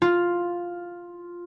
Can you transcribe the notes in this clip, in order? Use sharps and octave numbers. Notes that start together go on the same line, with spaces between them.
F4